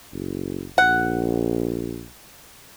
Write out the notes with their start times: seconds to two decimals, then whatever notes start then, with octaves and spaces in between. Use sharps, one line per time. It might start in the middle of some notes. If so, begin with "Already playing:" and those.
0.13 F#1
0.78 A#1 F#5